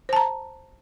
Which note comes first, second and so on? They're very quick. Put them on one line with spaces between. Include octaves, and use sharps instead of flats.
C5 A5 A#5